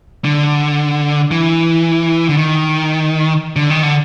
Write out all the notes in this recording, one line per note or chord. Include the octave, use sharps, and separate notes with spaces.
D3
E3
D3
D#3
D3
D#3
D3